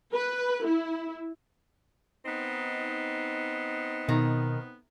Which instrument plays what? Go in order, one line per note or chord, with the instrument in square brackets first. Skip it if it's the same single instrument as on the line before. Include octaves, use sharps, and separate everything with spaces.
[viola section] B4
E4
[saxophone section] B3 C4 D#4
[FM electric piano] B2 [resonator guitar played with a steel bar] D#3